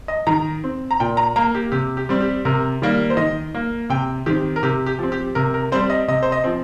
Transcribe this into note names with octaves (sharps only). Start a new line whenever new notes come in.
D#5
D#3 A#5
C4
A#5
A#2 G5
A#5
A#3 A#5
G4
C3 G4
G4
G3 C4
G4
C3 A#4
D#3 G3 A#3
C5
D#3 D#5
A#3
C3 G5
D#3 C4 G4
A#4
C3 G4
G4
F3 C4
G4
C3 A#4
A#4
G3 C4 C5
D#5
C3 D#5
C5
D#5
F3 C4